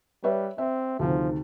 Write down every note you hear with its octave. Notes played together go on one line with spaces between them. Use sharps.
G3 B4 C#5 E5
C4 E5
D2 C3 D#3 F3